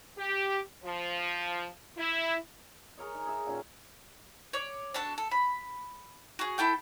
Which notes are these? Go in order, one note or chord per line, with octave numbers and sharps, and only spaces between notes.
G4
F3
E4
G#4 A#4 C#5 D#5
D#4
G#4 E5
A#2 D#3 C#4
C#5 D5
D4 F#4 A4 A5
A4
B5
F#4 G#4
E4 A4 G5 G6